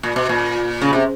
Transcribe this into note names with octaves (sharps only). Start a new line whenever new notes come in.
A#2
B2
A#2
C#3
C3